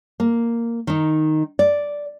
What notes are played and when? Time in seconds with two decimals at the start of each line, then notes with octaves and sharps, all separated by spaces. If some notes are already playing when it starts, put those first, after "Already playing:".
0.20 A#3
0.87 D#3 D#4
1.59 D5